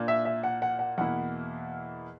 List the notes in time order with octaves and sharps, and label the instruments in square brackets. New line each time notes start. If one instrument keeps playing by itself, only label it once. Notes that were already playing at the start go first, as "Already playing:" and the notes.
Already playing: [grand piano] A#2 A#3 D4
[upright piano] E5
E5
F#5
F#5
F#5
[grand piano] E2 B2 A#3 E4 [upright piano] F#5